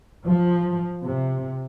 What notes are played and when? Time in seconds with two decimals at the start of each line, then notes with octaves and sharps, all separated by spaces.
0.26 F3
1.03 C3